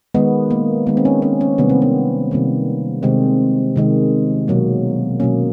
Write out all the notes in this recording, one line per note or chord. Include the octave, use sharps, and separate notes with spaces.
D#3 G#3 B3
A#3
D#3 G#3 B3
C4
C#4
C#4
C#4
C3 D#3 G3 A#3 B3
C4
B3
C3 D#3 G3 A#3
C3 D#3 G#3 C4
C3 D#3 G#3
B2 F#3 A#3
B2 F#3 A#3 C#4